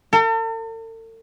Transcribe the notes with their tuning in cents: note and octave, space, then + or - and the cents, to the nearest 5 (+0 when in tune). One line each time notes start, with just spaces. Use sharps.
A4 +45